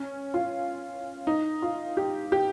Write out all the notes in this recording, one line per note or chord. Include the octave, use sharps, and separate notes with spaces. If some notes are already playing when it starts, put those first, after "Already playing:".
Already playing: C#4
F4
D#4
F4
G4
G4